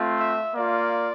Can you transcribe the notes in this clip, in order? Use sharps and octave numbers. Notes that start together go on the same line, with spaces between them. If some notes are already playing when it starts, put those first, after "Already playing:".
Already playing: A3 C4 F4
E5
A#3 F4 D5